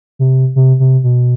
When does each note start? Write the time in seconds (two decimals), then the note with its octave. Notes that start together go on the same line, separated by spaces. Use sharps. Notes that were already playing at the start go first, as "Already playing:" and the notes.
0.19 C3
0.56 C3
0.80 C3
1.04 B2